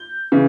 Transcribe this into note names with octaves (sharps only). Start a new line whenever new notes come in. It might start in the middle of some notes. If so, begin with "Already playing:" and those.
Already playing: G6
C#3 E3